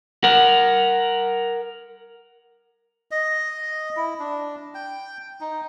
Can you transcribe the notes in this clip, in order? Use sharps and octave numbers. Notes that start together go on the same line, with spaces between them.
A#4 F#5
D#5
E4
D4
G5
D#4